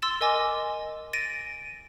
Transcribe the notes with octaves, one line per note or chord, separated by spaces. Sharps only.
C6 E6 A6 E7
A#4 D#5 G#5 D6 A#6
A6 A#6 D7 D#7